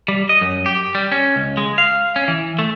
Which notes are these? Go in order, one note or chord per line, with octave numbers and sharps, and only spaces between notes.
G3
D#5
F#2
G4
G3
C#4
C#2
G#3
F5
C#4
E3
A3